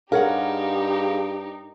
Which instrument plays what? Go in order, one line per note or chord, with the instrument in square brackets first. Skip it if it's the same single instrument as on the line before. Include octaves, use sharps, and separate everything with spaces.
[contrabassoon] G2 [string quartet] D#4 G4 [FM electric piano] G#4 F5 [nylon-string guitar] A#4 C#5 F#5